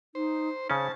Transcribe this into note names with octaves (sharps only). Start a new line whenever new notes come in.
D#4 C5
C#3 C#4 C5 A5